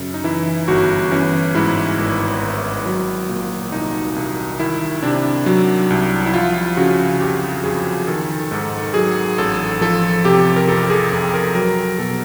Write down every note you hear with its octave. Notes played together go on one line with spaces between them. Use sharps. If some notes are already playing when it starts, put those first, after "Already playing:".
Already playing: F#2 C#3
D#4
E3 E4
G1 F#4
E3 C#4
G#2 E4
G#1
G#1
F#3
A#2
C2 D#4
C2
D#3 E4
C3 D4
F#3
C2
E4
F3 F4
C#3 F#4
F2 G4
F2 G#4
D#3 A4
G#2 A4
F#3 G#4
A1 A4
F3 A4
C3 G4
A#4
F2 A4
G#4
F2 A4
A#4
F#3 A#4
B2 A4